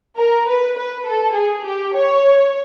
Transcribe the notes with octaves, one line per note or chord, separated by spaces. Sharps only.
A#4
B4
B4
A4
G#4
G4
C#5